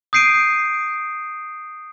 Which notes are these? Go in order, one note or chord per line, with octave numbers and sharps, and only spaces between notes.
D#6 G6 C7 D7 D#7